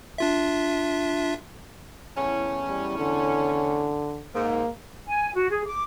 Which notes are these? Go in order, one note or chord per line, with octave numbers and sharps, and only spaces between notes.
D4 F4 E5
E2 A2 C#4
G3
D3
G#2 A#3
G#5
F#4
G#4
D6